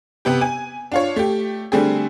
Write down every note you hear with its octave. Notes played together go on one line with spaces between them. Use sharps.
C3 B3 G4
G#5
D4 F4 C#5
A3 G4
D3 G3 A3 C4 G#4